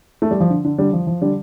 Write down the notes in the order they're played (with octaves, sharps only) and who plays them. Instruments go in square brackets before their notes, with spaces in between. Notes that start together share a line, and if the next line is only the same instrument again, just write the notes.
[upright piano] A3
G3
F3
D3
D3
D3 G3
F3
F3
D3 G3